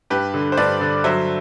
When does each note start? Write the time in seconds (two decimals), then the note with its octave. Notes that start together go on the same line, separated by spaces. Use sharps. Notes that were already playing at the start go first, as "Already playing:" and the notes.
0.10 G2 G4 B4
0.34 D3
0.52 C5
0.57 G2 B4 D5
0.81 D3
1.04 F#3 C5 E5